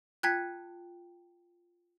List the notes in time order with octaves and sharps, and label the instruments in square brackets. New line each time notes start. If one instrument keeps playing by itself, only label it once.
[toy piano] F4 G5 A5 [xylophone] F#6 G#6 B6